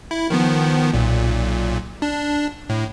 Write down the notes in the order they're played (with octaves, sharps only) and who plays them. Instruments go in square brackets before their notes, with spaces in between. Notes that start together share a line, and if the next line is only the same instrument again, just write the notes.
[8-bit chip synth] E4
D#3 F3 B3
B1 A#2
D4
A2